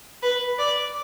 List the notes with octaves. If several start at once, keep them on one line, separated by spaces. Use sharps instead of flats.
B4
D5